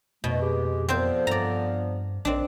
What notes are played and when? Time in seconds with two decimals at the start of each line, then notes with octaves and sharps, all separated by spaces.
0.24 F2 G#2 B2 A3
0.41 G#3 G4
0.89 D3 F3 B3 C4 C5
1.27 G2 D5 A#5
2.25 A#1 C4 D4